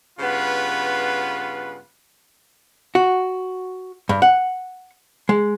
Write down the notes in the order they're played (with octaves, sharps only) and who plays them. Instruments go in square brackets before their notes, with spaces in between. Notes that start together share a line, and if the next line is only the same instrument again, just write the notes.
[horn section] G2 C#3 B3 F4 B4
[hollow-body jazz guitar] F#4
G2
F#5
G#3